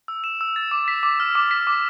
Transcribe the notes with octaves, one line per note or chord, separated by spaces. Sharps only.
E6
E7
E6
A6
D6
B6
D6
F6
D6
B6
D6